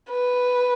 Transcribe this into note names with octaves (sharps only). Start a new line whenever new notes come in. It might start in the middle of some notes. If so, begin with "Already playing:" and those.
B4